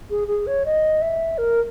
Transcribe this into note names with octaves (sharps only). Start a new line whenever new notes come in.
G#4
G#4
C#5
D#5
E5
A#4